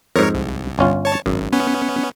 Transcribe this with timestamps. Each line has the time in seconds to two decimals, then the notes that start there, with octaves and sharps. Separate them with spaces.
0.16 F2 G#2 A#4 C#5
0.34 C2
0.79 G1 C#4 F4
1.05 C#5 A5
1.26 G#1 F#2
1.52 B3 C#4